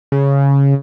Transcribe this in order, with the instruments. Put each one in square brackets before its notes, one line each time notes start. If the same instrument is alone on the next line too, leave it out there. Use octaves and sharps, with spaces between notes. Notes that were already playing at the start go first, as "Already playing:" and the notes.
[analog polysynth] C#3